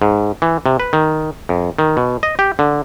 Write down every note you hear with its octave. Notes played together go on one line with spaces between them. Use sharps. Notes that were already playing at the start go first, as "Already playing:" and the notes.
G#2
E3
C3
B4
D#3
F2
D#3
B2
D#5
G4
D3